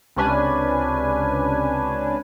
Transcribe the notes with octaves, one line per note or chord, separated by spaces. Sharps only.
C#2 C3 C#4 D4 B4 G#5